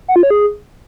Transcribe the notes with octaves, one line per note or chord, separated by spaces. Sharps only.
F#5
F4
C#5
G#4